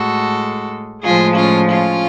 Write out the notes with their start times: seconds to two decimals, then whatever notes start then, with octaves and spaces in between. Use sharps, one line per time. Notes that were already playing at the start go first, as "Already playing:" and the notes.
Already playing: A2 G#3 F#4 A4
1.03 A2 F3 G#3 F4 G#4
1.35 C#4 F4
1.68 C#4 F4